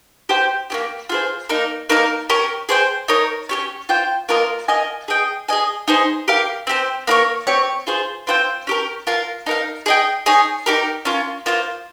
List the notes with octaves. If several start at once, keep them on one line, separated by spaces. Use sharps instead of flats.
G4 C5 G5
A#3 C#4 G4
F4 G#4 C5
A#3 D#4 A#4
A#3 D#4 A#4
C#4 G4 A#4
G#4 C5 G5
D#4 A#4 C#5
C#4 G4 C#5
F4 C5 G5
A#3 F4 A#4 D#5
F4 A#4 D#5 G#5
G#4 D#5 G5
G#4 D#5 G#5
D#4 G#4 C5
G4 A#4 F5
C4 G4 C5
A#3 D#4 A#4 C#5
C4 G4 C#5
F4 G#4 C5
C4 F4 C5 G5
C#4 G4 A#4
F4 A#4 F5
D#4 A#4 F5
G#4 D#5 G5
D#4 G#4 C#5 G#5
D#4 G4 A#4
C#4 F4 A#4
A#3 F4 C5